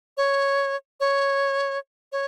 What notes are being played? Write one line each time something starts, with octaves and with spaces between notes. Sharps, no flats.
C#5
C#5
C#5